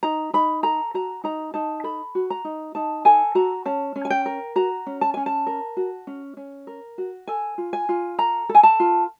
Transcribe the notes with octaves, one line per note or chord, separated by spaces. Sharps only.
D#4 A#5
D#4 B5
A4 A#5
F#4 A#5
D#4 A#5
D#4 A5
A4 B5
F#4
A#5
D#4
D#4 A5
A4 G#5
F#4 A#5
C#4 A5
C#4
G#5
G5
A#4
F#4 A#5
C#4
A5
C#4 G#5
A5
A#4
F#4
C#4
C#4
A#4
F#4
A4 G#5
F4
G#5
F4
A4 A#5
A4
G#5
A5
F4